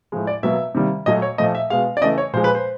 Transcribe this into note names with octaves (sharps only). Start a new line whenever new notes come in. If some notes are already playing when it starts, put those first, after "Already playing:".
A2 F3 G#3
D5
B2 F#3 A#3 E5
C3 D#3 G3 A#3
A#2 F#3 A3 D#5
C#5
A#2 F3 A3 D#5
E5
B2 G#3 F5
D5
C#3 E3 A3 D#5
C#5
A#2 F3 G#3 C5
B4
C5